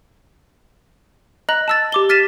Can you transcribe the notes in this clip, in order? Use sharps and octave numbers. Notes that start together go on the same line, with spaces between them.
D#5 A#5 F#6 F#7
A5 E6 A6
G4 D6 G7
F6 A6 B6 D#7 E7